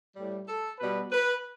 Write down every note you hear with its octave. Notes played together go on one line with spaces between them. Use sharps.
A2 G3
A4
B2 G3 B4
B4